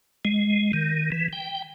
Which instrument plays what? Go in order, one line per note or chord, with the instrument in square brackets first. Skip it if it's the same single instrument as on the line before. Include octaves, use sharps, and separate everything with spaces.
[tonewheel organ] G#3
D#3
E3
G5